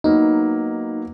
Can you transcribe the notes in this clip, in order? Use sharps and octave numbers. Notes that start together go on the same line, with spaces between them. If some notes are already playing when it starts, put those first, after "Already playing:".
F#3 A#3 B3 D#4